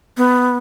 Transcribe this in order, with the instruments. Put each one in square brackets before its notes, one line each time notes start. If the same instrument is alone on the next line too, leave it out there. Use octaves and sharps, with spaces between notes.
[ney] B3